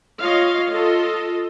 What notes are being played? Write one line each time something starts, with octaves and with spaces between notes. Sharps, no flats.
F4 C#5 D#5 F5
F4 A4 D#5